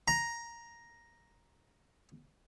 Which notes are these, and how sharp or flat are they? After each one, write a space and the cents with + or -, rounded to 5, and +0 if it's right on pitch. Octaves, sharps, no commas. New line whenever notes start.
A#5 +5